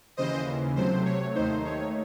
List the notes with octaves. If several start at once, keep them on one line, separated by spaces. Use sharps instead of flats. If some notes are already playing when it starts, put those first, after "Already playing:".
D#2 C#3 E3 C5 D#5
C3 F#3 A3 C5
C#5
D#2 D#3 A3 D#4 C5
C#5